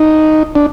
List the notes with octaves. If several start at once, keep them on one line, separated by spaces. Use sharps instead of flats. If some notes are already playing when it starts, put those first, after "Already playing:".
Already playing: D#4
D4